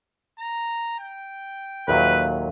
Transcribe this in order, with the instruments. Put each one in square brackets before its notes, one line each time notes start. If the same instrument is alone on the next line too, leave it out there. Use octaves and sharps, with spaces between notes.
[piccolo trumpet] A#5
G5
[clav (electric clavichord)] D#2 A#2 F#3 [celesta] A4 E5 F5 [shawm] B4